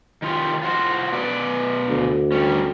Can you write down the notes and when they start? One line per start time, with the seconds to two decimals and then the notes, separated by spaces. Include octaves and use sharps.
0.22 D#3 F4 G4
0.63 F4 F#4 C5
1.12 B2 B4 D5
1.87 D2
2.32 G3 C#4